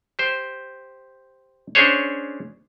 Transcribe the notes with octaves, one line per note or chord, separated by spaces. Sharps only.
G4 C5
C#4 D4 G#4 C5 C#5